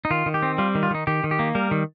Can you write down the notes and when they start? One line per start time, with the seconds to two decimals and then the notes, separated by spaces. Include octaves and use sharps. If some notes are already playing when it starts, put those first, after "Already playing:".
0.05 D#4
0.11 D#3 F4
0.26 D#3
0.34 G4
0.43 C4
0.58 G3 F4
0.75 D#3
0.83 F4
0.91 D#3 D#4
1.07 D#3 G4
1.24 D#3
1.31 G4
1.39 A#3
1.55 G3 A#4
1.71 D#3